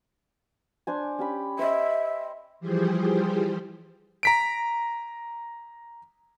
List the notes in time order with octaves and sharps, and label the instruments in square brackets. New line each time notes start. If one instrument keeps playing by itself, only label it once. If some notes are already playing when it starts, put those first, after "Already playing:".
[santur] D4 C5 G#5
C#4 G4 B5
[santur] C5 D#5 [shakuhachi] E5
[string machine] E3 F3 G3 G4 G#4 C5
[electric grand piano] A#5 B6 D7